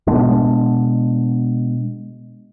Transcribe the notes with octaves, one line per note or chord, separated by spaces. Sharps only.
B2 G#3 B3 D4